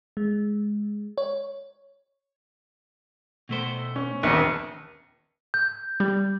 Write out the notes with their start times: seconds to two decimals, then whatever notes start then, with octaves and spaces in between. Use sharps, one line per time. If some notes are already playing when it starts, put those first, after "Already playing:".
0.17 G#3
1.18 C#5
3.49 B2 A3 C5
3.96 C#4
4.23 D#1 A#1 B3 C4
5.54 G6
6.00 G3